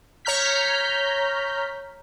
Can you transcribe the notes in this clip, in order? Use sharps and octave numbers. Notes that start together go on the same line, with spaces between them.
C#5 A#5 F6 G6 B6